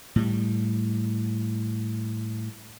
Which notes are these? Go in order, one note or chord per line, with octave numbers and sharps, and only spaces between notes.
A2 G3